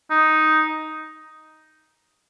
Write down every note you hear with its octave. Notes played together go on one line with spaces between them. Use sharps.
D#4